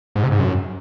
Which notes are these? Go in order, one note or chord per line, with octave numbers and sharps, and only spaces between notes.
G#2
C3
G#2
F#2